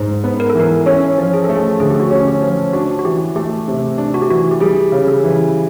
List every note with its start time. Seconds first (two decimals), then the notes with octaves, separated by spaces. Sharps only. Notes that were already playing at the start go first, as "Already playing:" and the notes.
Already playing: G#2 G#3 C5
0.24 B3
0.40 A#4
0.50 A4
0.55 E3
0.60 A#4
0.86 C#4 A4
1.18 F3
1.34 G#4
1.44 A3 A4
1.55 G#4
1.80 D3 G#4
1.90 G4
2.00 F#4
2.10 C#4 G4
2.27 G4
2.42 F3
2.73 D4 F#4
2.99 F#4
3.05 E3 G4
3.36 A3 G4
3.68 C3
3.98 D4
4.14 F#4
4.22 G4
4.30 E3 F#4
4.51 G4
4.60 G3 G#4
4.92 C#3
5.08 A4
5.24 E3